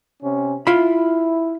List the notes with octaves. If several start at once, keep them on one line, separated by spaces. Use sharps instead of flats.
C3 C#4
E4 F4 B5